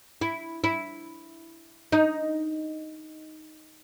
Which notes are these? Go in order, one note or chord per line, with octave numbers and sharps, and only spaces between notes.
E4
E4
D#4